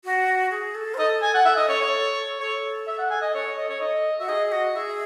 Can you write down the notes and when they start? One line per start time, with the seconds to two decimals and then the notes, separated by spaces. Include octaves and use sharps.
0.04 F#4
0.51 G#4
0.75 A4
0.94 C5
0.98 A4 D#5
1.22 G#5
1.34 F#5
1.45 A4 E5
1.57 D#5
1.68 C#5
1.81 C#5
2.40 A4 C#5
2.87 E5
2.99 F#5
3.10 G#5
3.22 D#5
3.34 C#5
3.57 D#5
3.69 C#5
3.80 D#5
4.19 F#4 E5
4.28 G#4 D#5
4.52 F#4 D#5
4.76 G#4 E5